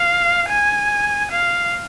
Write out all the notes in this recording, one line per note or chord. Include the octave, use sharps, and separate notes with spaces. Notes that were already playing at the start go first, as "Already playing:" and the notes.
Already playing: F5
G#5
F5